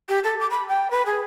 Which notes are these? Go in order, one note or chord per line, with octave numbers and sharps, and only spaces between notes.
G4
A4
D6
B5
G5
B4
G#4